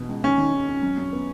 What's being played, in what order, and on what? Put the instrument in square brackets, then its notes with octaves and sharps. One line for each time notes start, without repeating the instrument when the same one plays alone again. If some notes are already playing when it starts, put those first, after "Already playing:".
Already playing: [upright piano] B2 E3
C#2
[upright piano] D#2 [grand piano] C#4
[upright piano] D#3
D#3
C#4
F#2
F#2
B3